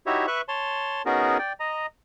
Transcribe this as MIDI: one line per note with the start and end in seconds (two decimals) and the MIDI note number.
0.06 0.26 63
0.06 0.26 64
0.06 0.26 66
0.06 0.26 67
0.06 0.26 73
0.06 0.26 76
0.27 0.41 71
0.27 0.41 76
0.27 0.41 85
0.27 0.41 90
0.48 1.02 73
0.48 1.02 81
0.48 1.02 84
1.06 1.38 59
1.06 1.38 61
1.06 1.38 63
1.06 1.38 66
1.06 1.38 68
1.06 1.38 70
1.39 1.53 74
1.39 1.53 79
1.60 1.86 75
1.60 1.86 82